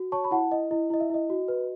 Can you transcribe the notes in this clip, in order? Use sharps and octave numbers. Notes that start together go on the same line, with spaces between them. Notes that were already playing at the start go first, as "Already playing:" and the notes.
Already playing: F#4
C#5 A5 C#6
B5
E4 F#5 A5
E4 D#5
E4 D#5
E4 D#5
E5
E4 D#5
F#4
B4